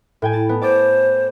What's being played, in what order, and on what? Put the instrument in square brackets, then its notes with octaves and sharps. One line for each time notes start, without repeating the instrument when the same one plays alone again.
[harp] A2 G5 G#5
[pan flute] E4 [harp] A5
[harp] B3
[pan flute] C5 [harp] D5 D6 A6